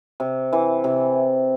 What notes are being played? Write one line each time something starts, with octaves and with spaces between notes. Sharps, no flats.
C3
E3
C3